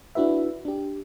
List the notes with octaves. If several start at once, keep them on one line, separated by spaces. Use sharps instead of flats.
D4 E4 F#4 B4 E5
D4 G4